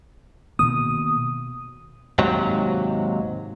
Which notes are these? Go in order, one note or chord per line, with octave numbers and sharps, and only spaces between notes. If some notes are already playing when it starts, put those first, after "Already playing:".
B2 D#3 A#3 D#6
D#2 G#2 C3 F#3